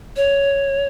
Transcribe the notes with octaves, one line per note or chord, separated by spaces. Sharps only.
C#5